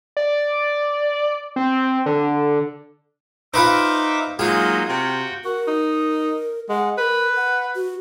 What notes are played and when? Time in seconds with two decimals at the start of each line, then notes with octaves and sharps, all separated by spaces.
0.17 D5
1.56 C4
2.06 D3
3.54 D#4 F4 B4 C5 E5 D6
4.39 F#3 G#3 A#3 D#4 F4
4.89 C3 F#4 G5
5.45 F#4 A#4
5.68 D#4
6.69 G#3 F#5
6.98 A#4 B4
7.36 F#5
7.75 F#4